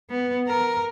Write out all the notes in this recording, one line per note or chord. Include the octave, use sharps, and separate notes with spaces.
B3
A#4